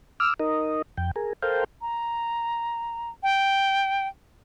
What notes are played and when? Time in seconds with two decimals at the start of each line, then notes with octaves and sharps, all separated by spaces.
0.20 D6 E6 F6
0.40 D#4 A#4 D#5
0.97 F2 G5
1.16 G#4 A#4
1.43 A4 A#4 C5 F5 G5
1.82 A#5
3.23 G5